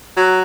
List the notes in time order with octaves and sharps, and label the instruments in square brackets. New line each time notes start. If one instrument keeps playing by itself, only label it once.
[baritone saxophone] F#3